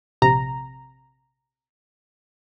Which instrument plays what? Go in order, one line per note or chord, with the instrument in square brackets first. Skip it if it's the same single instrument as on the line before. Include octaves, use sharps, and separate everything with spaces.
[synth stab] A#1 C3 A#5